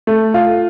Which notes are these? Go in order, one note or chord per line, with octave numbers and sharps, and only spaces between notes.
A3
F4